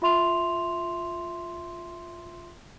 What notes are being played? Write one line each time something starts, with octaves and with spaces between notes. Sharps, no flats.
F4 E5 C6 F7